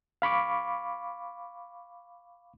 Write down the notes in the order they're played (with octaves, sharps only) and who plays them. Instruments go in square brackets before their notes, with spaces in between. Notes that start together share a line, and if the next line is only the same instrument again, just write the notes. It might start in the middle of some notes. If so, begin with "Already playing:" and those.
[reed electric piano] F5 B5 C#6 D6